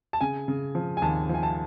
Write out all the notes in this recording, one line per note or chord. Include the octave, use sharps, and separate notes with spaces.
A5
C#3 G#5
C#3
F3
G#5
D#2 A5
F3 G#5
A5